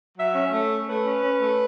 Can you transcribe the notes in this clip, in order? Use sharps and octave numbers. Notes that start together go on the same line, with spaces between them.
F#3 E5
C#4
A3 C#5
C#4
A3 B4
C#4
C#4
A3